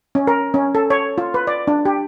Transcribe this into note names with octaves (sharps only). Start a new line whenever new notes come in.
C#4
A#4
C#4
A4
C#5
F4
B4
D5
D4
G4